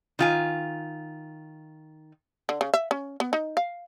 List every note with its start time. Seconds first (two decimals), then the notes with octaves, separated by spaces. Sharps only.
0.19 D#3 F4 G#5
2.49 D3
2.61 C#3
2.74 E5
2.91 C#4
3.20 B3
3.33 D#4
3.57 F5